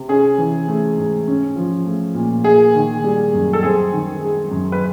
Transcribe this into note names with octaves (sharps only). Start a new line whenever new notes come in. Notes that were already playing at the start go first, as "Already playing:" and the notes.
Already playing: C3
C#4 G#4
E3
A3
G#2
C#4
F3
A3
A#2
A#3 G#4
D#3
G3
F#2
A4
C4 G#4
D#3
G#3
F#2
B4